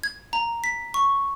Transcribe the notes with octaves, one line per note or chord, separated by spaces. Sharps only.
G#6
A#5
B6
C#6